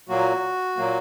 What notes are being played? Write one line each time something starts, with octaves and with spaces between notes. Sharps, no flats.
A#2 F#3 A#3 F#4
A#2 F#3 A#3